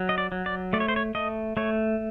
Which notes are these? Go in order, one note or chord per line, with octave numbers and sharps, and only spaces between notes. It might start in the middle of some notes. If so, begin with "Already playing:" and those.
Already playing: F#3
D#5
D5
F#3
D5
A3 D5
C#5
C5
C#5
A3 D#5
A3 C#5